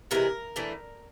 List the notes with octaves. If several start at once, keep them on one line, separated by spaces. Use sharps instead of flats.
C3 E3 G#3 A#4
E3 A3 D4